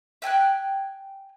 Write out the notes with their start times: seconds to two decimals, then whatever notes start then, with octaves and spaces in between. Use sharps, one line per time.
0.22 E5 G5 G#5 F#6